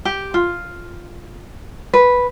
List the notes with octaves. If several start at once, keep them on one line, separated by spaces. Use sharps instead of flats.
G4
F4
B4